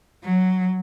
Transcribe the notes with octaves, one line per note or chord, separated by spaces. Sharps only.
F#3